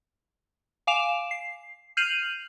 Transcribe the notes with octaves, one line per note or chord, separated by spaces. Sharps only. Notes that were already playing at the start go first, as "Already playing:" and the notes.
F5 G#5 D6 D7 E7 F7
C7
F6 G6 C7 D#7 F7 F#7